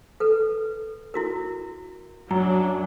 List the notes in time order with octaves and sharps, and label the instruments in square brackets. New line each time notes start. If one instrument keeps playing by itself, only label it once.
[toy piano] A4 B4
E4 F#4 A#4
[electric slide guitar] F#2 [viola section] F#3 D4 [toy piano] A#5